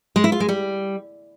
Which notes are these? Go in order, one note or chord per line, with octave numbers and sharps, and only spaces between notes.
G#3
E4
F4
G#3
G3